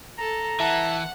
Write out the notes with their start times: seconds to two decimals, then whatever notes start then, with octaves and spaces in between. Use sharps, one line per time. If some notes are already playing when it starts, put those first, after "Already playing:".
0.18 A4 A#5
0.60 E3 E5 F#5 A5